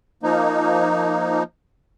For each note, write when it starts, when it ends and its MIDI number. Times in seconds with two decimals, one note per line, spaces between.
0.23 1.43 53
0.23 1.43 58
0.23 1.43 63